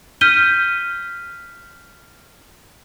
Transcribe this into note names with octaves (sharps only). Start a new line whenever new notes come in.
F6 G6 B6 D#7 G7